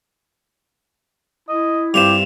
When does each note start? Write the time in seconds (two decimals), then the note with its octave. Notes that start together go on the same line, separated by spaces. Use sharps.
1.49 E4 D#5
1.94 G2 C3 F4 G4 E7 F7